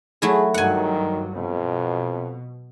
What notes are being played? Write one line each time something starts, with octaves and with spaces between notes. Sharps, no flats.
F#3 A3 E4 G#4
G2 D#3 F#3 F#5 G#5
F2 B2